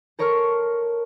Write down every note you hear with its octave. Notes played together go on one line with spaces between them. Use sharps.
A4 A#4 C#5 C6 C#6 F6